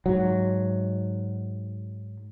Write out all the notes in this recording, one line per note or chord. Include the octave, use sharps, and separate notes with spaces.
G#2 F#3